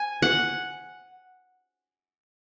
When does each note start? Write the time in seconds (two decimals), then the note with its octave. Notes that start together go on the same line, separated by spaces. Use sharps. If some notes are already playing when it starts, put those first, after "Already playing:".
Already playing: G#5
0.22 F#5